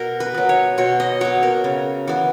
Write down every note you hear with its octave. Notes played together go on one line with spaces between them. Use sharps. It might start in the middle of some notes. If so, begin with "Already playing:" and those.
Already playing: B2 A#4
B4
F#3 B3
C#5
B2 C#5
D#5
F#3 B3 C#5
A#4
C#3
E3 B3